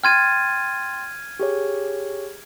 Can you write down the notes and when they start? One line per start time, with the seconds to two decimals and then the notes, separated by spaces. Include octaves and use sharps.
0.04 G5 C6 F6 G#6 A6 D#7
1.39 G4 G#4 C#5